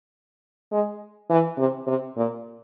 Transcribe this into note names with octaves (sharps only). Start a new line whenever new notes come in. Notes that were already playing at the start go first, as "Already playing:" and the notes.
G#3
E3
C3
C3
A#2